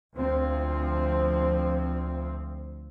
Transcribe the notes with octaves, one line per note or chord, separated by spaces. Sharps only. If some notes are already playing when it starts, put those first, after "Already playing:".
D2 F3 C4